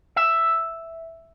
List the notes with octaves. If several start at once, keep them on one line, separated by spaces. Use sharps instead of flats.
E5